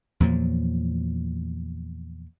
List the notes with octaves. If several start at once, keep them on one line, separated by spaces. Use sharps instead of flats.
E2 A#2 F3 F#3